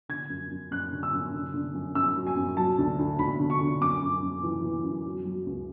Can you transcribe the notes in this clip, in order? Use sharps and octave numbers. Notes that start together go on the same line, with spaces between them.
D3 G#6
F#2
F#2
F#2 F#6
D3
E6
F#2
D3
D3
F#2
F#2 E6
F#3
G#5
F#2
F#3 A5
D2
D2
D2 B5
D3
C#6
D3
F#2 D6
F#2
F#2
E3
E3
F#2
F#3
F#3
C#2